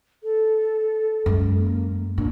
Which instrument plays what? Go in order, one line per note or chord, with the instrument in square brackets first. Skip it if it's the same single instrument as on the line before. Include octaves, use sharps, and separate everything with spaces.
[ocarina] A4
[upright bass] F#2 G#3
[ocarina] A#3
[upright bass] A#2 F#3 [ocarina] D4